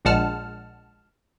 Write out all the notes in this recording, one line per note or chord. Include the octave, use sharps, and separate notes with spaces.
A#1 A#2 G#3 F#5 A5 F6